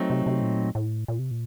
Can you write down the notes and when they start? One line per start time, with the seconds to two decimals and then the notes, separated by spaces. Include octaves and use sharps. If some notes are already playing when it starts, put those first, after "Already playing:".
Already playing: F#3 A3 C4 D#4
0.10 C3
0.26 C3
0.42 A#2
0.75 A2
1.08 A#2
1.19 C3
1.31 A#2